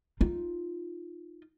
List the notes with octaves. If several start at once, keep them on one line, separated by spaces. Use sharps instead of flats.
D#4 F4